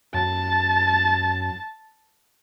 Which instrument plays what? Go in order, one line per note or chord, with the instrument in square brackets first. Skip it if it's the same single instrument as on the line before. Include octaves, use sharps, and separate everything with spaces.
[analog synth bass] F#2 [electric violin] A5